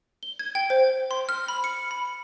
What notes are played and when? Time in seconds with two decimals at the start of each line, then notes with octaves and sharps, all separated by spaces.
0.23 G7
0.39 G#6
0.55 G5
0.70 C5
1.11 C6
1.29 F6
1.48 B5
1.64 C#7
1.91 B5